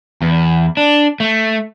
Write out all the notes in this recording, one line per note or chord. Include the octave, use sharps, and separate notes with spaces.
E2
D4
A3